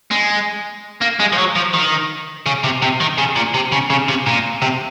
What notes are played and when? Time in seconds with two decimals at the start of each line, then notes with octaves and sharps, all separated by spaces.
0.11 G#3
1.01 A#3
1.20 G#3
1.33 F3
1.38 F#3
1.56 F3
1.73 D#3
2.46 C#3
2.64 C3
2.82 C3
3.00 D#3
3.18 C#3
3.36 A#2
3.54 C3
3.72 C#3
3.90 C#3
4.08 C3
4.27 A#2
4.62 C3